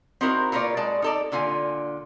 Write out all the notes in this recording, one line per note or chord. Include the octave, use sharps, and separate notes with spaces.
C4 D#4 E4 F#4 A#4 C5
A#2 F4 A#4 B4 C#5 D5
G#3 D5 A5
D#4 A4 D5
A#2 D3 F4 G#5